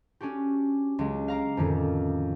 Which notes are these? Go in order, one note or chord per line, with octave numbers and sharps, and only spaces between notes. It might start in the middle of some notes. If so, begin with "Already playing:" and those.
C#4 D4 F#4 G4
C#2 F#3 G#3
F5 A#5 D6
F2 A2 D3 D#3 C#4